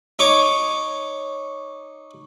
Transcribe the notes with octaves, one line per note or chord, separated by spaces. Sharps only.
D#4 C#5 D6